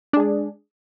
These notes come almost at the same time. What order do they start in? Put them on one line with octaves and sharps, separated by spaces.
D4 G#3 G#4